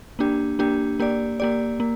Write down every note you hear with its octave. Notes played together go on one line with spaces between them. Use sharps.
A#3 D4 G4
A#3 D4 G4
A#3 G4 D5
A#3 G4 D5
A#3